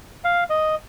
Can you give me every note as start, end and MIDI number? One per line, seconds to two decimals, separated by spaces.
0.24 0.44 77
0.50 0.75 75